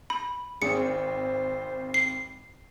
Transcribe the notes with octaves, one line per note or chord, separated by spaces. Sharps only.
B5
G#1 C4 G#4 C#7
C5
C7